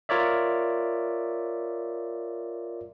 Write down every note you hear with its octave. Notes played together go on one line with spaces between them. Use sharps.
F4 A#4 C#5 D5 E5